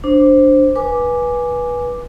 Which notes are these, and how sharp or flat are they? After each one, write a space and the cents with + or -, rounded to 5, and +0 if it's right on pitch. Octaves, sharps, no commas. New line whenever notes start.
D4 +0 C5 +5
B4 -20 G#5 +0 D6 +0